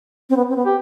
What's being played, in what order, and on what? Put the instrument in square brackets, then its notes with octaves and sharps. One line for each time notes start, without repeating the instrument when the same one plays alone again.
[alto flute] C4
B3
C4
B3
[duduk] G4